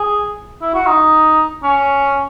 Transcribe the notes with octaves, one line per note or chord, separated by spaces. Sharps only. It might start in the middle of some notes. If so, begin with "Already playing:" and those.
Already playing: G#4
E4
F#4
D#4
C#4